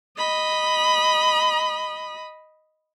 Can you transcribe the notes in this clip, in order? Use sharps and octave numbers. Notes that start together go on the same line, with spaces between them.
D#5 B5